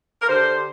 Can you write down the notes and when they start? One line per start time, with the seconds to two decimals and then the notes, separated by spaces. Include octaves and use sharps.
0.22 A#4
0.29 D3 G4 C5